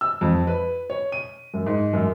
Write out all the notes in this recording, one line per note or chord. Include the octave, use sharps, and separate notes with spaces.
E6
F2
B4
C#5
D#7
F#2
G#2
F#2